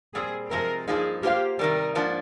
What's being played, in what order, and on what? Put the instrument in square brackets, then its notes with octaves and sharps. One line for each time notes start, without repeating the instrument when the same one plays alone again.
[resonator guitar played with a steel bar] A#2 G3 C4 [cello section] G#4
[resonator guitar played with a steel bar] C3 F3 G#3 C4 G4 [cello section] A#4
[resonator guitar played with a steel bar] G2 F3 A#3 D#4 [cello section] G#4
[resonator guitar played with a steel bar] A#3 F4 C5 F5 [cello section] G4
[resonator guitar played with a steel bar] C3 D#3 G3 [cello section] A#4
[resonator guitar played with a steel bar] G#2 F3 A#3 D4